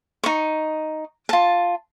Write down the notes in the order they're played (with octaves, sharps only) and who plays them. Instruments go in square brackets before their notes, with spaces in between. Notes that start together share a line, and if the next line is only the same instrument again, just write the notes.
[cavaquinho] D#4 C#6
F4 A5